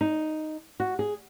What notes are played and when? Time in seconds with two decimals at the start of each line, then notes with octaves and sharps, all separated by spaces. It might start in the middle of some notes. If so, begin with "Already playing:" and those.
0.01 D#4
0.80 F#4
0.99 G#4